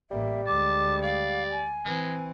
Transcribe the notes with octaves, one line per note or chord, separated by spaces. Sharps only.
A1 G3 A#3 E5
D2 G#3 A5 D6
D5 F5
G#5
E3 G#3 C4